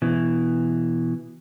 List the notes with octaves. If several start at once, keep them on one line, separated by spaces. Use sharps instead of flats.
B2 E3